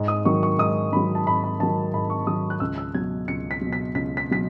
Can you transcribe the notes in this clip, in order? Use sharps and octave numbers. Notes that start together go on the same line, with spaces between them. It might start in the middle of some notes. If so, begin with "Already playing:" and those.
Already playing: G#2
D#6
D#3 F#3 C#6
C#6
G#2 D#6
D#3 F#3 B5
A5
G#2 B5
B5
D#3 F#3 A5
G#2 B5
C#6
D#3 F#3 D#6
F#6
C#2 E6
E6
B2 F#3 G#6
C#2 C#7
B6
B2 F#3
B6
C#2 B6
B6
B2 F#3 B6